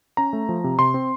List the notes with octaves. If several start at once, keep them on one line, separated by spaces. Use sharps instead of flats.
C#4 A#5
A3
F3
C3
C3 C6
C4